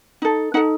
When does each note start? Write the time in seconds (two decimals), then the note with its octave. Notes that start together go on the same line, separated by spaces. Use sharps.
0.22 D#4 A4
0.54 D#4 A4 F#5